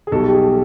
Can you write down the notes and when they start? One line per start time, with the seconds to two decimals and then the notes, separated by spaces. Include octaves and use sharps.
0.07 G#4
0.12 B1 B2 G3 A4
0.28 G4
0.34 G#4